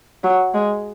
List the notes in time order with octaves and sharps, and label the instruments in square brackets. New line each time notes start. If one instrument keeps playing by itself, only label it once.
[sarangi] F#3
G#3